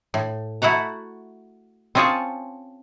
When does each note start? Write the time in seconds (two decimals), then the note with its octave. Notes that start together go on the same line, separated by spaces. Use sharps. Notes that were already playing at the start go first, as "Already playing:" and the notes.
0.14 A2
0.62 A3 E4 F#4 F#5 A#5
1.95 C4 C#4 F4 G#4 C#5 A5